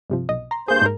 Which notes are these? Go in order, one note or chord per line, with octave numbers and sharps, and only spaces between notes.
G2 C3 F3
B1 D#5
A#5 C6
G2 A#3 G#4 C5 G6
G#2 A#4